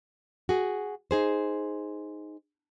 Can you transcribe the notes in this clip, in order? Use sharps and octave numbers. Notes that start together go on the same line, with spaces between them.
F#4 G#4
D#4 G#4 C5